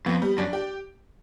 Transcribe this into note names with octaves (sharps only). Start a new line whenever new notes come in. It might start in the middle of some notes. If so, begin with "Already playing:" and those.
F2 B3
G3
F#2 D4
G4